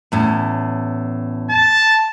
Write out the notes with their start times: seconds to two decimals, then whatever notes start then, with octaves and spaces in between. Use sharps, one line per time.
0.12 E2 A2 C#4
1.50 A5